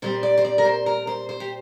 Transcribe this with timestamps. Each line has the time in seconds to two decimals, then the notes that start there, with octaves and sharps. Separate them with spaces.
0.02 A#2 G3 C4 C5
0.23 D5
0.38 C5
0.45 D5
0.58 A#4
0.65 C5
0.86 A#4
1.07 C5
1.29 C5
1.40 G4